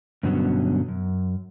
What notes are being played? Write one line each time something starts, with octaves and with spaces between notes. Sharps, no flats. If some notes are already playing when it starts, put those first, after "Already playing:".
G2 B2 D3 F#3 B3 C#4
F#2